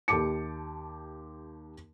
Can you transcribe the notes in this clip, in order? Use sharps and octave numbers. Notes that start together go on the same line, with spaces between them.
D#2 G4 A5 D6 C#7